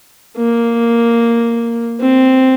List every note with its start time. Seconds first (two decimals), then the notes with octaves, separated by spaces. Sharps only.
0.37 A#3
2.00 C4